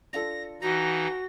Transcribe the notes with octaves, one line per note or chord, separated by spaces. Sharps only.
D4 F4 A4 A#6
E3 D#4 F#4 A#6